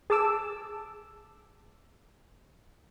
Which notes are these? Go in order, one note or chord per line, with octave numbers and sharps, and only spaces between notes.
G#4 A5 D6 E6